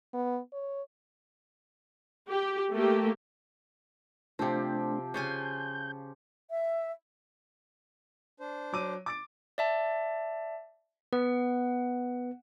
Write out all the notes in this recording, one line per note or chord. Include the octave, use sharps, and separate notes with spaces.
B3
C#5
G4
A3 A#3 G4
C3 F3 A3 C4 D4 G4
C#3 F4 G#5 G6
E5
D4 C5
F#3 D6 D#7
D6 A6 D7
D5 E5 A5
B3 F#5